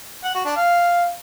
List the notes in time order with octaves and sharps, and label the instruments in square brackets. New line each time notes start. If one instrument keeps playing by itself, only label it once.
[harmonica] F#5
F#4
D4
F5